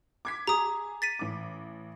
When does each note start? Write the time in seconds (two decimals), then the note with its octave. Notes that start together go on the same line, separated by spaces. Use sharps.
0.25 D6 G#6 B6
0.47 G#4 A#5 D#6
1.02 A6 B6 D#7
1.19 A1 D6